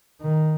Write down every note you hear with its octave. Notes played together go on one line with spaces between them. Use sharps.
D#3